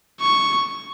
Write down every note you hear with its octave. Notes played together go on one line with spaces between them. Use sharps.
C#6